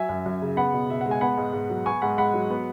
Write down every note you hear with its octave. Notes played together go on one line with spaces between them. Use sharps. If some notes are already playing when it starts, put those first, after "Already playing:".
Already playing: F#3 E5 G#5
F#2
F#2
C#3
B3 F#5 B5
B2
B2 E5
F#5
G#3
G#5
B3 F#5 B5
G#2
G#2
F#3
B3 G#5 C#6
G#2 F#5 B5
G#2 F#5 B5
F#3
B3